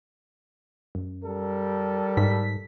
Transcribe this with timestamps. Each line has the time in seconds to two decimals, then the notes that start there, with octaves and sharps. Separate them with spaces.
0.95 F#2
1.23 G3 A4 A#4
2.17 G#2 B6